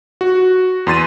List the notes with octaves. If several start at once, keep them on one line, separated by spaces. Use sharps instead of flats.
F#4
E2 C6 A6 D#7